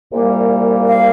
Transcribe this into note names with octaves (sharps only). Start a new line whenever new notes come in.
C2 A#2 G3 A#3
F5